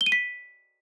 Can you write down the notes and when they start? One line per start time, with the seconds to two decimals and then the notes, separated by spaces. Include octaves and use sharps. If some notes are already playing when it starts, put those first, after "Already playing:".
0.01 G7
0.06 D#7
0.12 B6